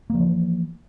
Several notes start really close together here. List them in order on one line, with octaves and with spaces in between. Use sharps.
A#3 F3 E3